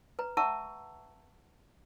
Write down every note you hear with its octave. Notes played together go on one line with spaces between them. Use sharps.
B4 A#5
E5 F#5 A5 A#5 C#6 E6